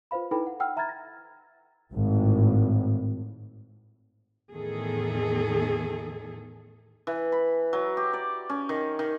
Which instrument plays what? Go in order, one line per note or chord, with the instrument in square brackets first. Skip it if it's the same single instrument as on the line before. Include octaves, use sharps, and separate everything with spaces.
[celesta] F4 B4 C5 F5 B5
D#4 E4 A4 B4 G5 B5
F#5
F#5 G5 E6 F6
E5 A#5 B5 F6 G#6 A6
A#6
[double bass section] G#1 A2
[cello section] E2 A2 D#3 G#4 A4
[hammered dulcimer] E3
B5
F#3
G4
D5
C#4
D#3
D#3